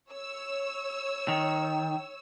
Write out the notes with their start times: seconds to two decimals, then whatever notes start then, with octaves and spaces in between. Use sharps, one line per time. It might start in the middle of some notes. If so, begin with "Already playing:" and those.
0.11 C#5 E6
1.28 D#3